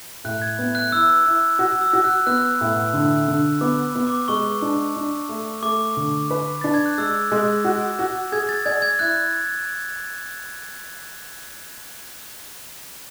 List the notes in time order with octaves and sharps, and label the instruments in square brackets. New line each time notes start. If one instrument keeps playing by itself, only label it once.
[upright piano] A2 [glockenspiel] F#6
[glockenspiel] G#6
[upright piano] B3
[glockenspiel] F#6
[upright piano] E4 [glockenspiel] E6
[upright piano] E4
F#4
[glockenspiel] E6
[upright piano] F#4
[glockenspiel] F#6
[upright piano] B3 [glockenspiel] F#6
[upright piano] A2
D3
D3
[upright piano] B3 [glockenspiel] D6
[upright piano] B3
[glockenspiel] D6
[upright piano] G#3 [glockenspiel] C#6
[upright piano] D4
D4
A3
[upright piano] A3 [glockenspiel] D6
[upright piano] D3
B4
[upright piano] D4 [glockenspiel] A6
[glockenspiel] G#6
F#6
[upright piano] G#3 [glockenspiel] E6
[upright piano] G#3
F#4
F#4
[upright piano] G#4 [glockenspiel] G#6
[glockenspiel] A6
[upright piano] D5 [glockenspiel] G#6
[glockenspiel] G#6
[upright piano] E4 [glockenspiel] F#6